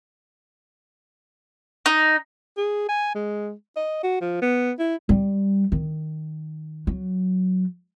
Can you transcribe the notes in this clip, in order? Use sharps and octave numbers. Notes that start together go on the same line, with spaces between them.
D#4
G#4
G#5
G#3
D#5
F#4
F3
B3
E4
G3
D#3
F#3